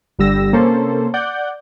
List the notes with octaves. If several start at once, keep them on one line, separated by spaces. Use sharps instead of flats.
G1 D3 G3 G4 E6 A#6
C3 A#3 C#4 A4 C5
D5 F#5 G6